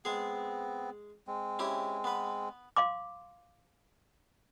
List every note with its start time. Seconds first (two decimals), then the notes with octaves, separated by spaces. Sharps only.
0.05 G#3 B3 C4 G#4
1.27 G#3 C4
1.59 C#4 E4 G4
2.04 B3 B4
2.76 F5 C6 D6